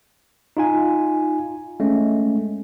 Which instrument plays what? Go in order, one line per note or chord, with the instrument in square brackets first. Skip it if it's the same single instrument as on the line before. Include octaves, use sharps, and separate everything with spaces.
[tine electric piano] D#4 F4 G#5
G#3 A3 C#4